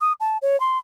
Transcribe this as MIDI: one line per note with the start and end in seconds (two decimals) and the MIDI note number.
0.01 0.13 87
0.20 0.38 81
0.42 0.59 73
0.60 0.78 84